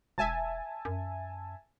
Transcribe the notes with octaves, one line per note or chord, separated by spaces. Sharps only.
E1 E5 G#5 A5
F#2